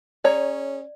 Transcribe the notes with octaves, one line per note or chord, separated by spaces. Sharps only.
C#4 G#4 C#5 D5 A#5